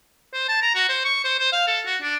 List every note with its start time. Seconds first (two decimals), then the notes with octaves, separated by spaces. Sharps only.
0.34 C5
0.49 A5
0.62 A#5
0.75 F#4
0.89 C5
1.05 C#6
1.25 C5
1.39 C5
1.53 F5
1.67 A4
1.86 F#4
2.02 D4